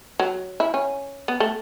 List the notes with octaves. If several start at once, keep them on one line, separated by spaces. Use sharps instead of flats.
F#3
E4
C#4
B3
A3